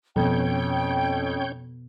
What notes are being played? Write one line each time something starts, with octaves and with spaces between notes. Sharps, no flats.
F2 B2 B3 C#4 C#5 G5 G6